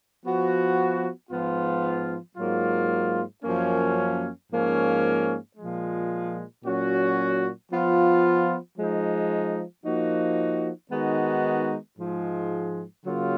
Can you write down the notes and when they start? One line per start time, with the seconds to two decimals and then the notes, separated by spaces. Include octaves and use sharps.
0.23 F3 B3 F#4
1.30 G#2 F3 B3 F4
2.37 G#2 F#3 A#3 F4
3.44 F#2 F3 A#3 C#4
4.51 G#2 F3 A#3 C#4
5.57 A#2 F3 G#3
6.64 A#2 F#3 C#4 F#4
7.71 F3 B3 F4
8.77 F3 G#3 D#4
9.84 F3 A#3 D#4 F#4
10.91 D#3 G#3 B3 D#4 F#4
11.98 G#2 F3 G#3
13.04 C#3 F#3 A#3 F4